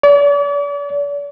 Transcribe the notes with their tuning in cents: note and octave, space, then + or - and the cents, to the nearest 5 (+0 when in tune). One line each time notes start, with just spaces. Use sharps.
D5 -40